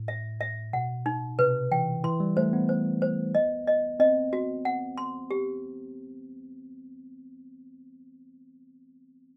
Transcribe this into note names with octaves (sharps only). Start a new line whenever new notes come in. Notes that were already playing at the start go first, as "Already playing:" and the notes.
Already playing: A2
E5
E5
B2 F#5
D#4
C3 B4
E3 G5
E3 C6
G3
A3 C5
B3
C5
C5
D#5
D#5
C4 D#5
F#4
F#5
C6
G4